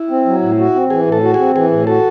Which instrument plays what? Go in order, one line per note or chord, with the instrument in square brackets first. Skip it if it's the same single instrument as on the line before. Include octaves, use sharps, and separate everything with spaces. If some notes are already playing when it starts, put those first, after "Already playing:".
Already playing: [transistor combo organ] E4
[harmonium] C4
F#3
A2
F#4
C4
[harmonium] E3 [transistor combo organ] G#4
[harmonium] A2
[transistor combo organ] A4
[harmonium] F#4
[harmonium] C4 [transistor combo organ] G#4
[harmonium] E3 [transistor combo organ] G#4
[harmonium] A2
[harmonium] F#4 [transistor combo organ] A4